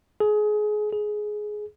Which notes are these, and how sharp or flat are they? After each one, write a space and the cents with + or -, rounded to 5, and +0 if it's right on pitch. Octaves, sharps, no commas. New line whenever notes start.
G#4 +25
G#4 +15